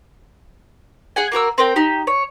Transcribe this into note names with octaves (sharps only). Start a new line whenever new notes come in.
G#4 F#5 G#5
A#3 F#4 A#4 E6
C4 A#4 G5
D#4 G4
C#5